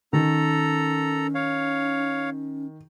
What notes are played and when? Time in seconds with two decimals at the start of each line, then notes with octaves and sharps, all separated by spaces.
0.13 D#3 C#4 A4 A#5
1.35 C#5 F5